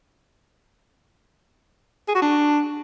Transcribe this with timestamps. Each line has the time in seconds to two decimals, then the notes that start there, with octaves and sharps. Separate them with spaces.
2.08 G#4
2.15 F#4
2.22 D4